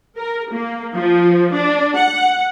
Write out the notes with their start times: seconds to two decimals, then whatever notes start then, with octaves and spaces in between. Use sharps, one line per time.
0.16 A#4
0.51 A#3
0.95 F3
1.52 D4
1.96 F#5